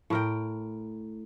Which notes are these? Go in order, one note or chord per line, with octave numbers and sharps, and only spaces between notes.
A2 A#4 G5